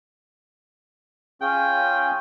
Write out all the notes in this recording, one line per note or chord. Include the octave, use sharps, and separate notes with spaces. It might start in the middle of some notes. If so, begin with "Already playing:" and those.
C#4 F4 G#4 G5